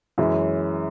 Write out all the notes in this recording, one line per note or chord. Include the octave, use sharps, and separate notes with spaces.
F#2 E3 G#3 C#4